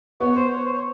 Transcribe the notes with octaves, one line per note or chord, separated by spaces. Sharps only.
B3 C#5
C5
C#5
C5
C#5